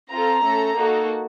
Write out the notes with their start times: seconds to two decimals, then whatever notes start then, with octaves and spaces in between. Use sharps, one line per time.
0.10 C4 F4 A4 A#5
0.43 A3 C#4 A4
0.75 A#3 D#4 F#4 A4